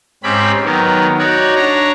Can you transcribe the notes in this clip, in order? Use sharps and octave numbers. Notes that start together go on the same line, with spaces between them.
G#2 C4 C#4 G4 B5
D#3 F#3 B3
D#4 F#4 C#5 D5
D4 C#5 A#5